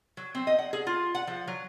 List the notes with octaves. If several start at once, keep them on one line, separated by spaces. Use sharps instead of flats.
F#3
C4
D#5
F#5
G#4
F4
F#5
F3
F#3